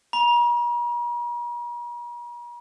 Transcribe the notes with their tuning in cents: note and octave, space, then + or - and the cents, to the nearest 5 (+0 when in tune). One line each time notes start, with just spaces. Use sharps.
A#5 +45